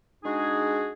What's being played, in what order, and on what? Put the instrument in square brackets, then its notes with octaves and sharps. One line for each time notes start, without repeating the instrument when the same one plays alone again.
[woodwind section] G#3 D4 D#4 F#4 G#4